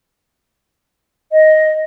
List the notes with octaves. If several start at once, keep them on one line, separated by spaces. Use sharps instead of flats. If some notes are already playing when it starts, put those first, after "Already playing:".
D#5